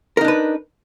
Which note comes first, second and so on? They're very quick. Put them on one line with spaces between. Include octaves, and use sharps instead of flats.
A#4 D#4 D4 B4